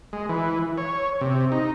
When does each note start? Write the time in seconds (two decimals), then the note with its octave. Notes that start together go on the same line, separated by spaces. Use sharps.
0.13 G#3
0.29 E3
0.78 C#5
1.21 C3
1.52 D#4